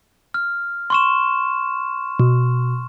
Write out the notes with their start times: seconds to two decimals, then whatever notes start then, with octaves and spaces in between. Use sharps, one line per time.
0.34 F6
0.90 C6 C#6 E7
2.20 B2